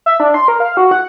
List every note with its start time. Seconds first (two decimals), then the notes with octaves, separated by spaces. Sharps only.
0.06 E5
0.20 D4
0.34 C6
0.48 A#4
0.60 F5
0.77 F#4
0.91 F#5